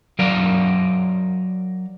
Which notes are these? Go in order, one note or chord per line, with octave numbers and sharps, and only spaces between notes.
F#3 A#4 D5 F5